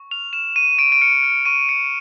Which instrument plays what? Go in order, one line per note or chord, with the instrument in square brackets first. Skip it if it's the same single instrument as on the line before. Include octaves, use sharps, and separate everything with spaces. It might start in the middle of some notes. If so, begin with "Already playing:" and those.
Already playing: [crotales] C#6
F6 F7
F6 E7
C#6 D#7
C#6 D7
D7
F6 C#7
F6 D7
C#6 D#7
C#6 C#7